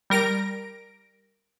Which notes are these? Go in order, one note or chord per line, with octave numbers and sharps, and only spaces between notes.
G3 A#4 A#6 D7